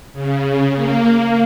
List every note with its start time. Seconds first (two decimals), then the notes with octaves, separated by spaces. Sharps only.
0.13 C#3
0.75 A#3